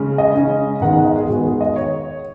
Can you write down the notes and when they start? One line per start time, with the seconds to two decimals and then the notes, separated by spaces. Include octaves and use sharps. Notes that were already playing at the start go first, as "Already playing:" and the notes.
Already playing: C#3 G#3 C#4
0.18 D#5
0.34 C#3 G#3 C#4
0.81 G#2 D#3 G#3 B3 F#5
0.93 F#5
1.04 D#5
1.17 G#4
1.28 G#2 D#3 G#3 B3 F#4
1.44 G#4
1.61 D#5
1.76 C#5